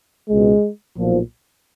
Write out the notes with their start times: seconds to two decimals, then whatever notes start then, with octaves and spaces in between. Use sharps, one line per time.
0.29 C#2 B2 G#3
0.96 B1 A#2 F3